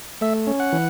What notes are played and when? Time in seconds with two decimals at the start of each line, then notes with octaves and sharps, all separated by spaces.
0.21 A3 E5
0.47 C#4
0.60 F#5
0.72 E3